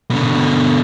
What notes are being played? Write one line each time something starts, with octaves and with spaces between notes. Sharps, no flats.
B2 D3